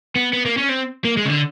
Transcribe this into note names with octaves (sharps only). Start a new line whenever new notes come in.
B3
B3
A#3
C#4
C4
A#3
G#3
C#3
D3